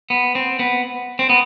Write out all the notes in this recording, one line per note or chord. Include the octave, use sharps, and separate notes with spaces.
B3
C4
B3
C4
B3